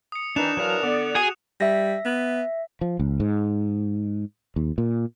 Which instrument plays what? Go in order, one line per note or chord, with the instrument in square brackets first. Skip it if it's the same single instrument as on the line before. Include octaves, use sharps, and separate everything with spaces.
[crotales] D#6 C#7
[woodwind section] D#3 E3 D#4 [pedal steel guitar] D4 [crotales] F#6 E7 F7
[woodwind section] E3 D4 A#4 [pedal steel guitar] F#3 F5
[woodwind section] D3 B3 [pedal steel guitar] D5
[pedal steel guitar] F#4 [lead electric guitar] G#4 G#5
[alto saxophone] G3 [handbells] E5 A#6
[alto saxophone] B3
[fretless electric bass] F3
C#2
G#2
D#2
A#2